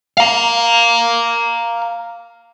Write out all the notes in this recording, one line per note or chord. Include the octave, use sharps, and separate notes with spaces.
F5 A#5